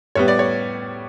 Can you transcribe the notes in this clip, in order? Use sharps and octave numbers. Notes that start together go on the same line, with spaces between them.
A2 G3 B3 C#5
D5
C#5